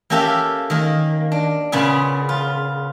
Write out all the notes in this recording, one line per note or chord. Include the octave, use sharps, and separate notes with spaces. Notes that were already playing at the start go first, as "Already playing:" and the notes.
A#3 C#4 G4 A4 E5 F5
D#3 A#3
D4
A#2 C#3 B3 G#4
F4